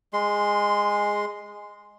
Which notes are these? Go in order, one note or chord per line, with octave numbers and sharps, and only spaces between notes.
G#3 C6